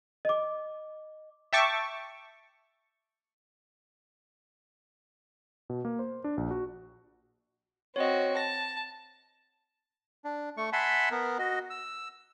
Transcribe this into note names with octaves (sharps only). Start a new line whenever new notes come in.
D#5 D6
E5 G5 A5 C#6 D6
B2
A#3
C5
D4
A#1
F#4
C4 F#4 C#5 D#5
A5 A#6
D4
A3 C#6
E5 F#5 G#5 A5 B5 C6
B3 A#4
F#4 D#5
E6